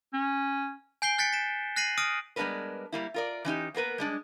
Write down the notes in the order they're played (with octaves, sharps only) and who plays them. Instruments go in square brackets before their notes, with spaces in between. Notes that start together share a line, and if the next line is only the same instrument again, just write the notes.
[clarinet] C#4
[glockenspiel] G#5 G6 C7 D7 G7
F#6 A6 B6 C#7
B6 E7
F#6 A#6 C7 D#7 F#7
D#6 F6 A#6 D7 D#7
[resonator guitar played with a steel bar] G3 G#3 B3 D4 A#4 B4
G3 A#3 E4
F4 A#4 D5
E3 C#4 D#4 G4
A#3 B3 A#4 B4
G3 G#3 D4